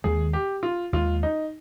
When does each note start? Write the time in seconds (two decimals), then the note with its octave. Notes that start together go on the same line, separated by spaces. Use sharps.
0.04 D#2 D#3 G#3 G#4
0.33 G4
0.63 F4
0.93 D#2 D#3 G#3 F4
1.23 D#4